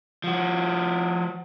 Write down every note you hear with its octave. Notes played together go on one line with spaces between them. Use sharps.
F3 F#4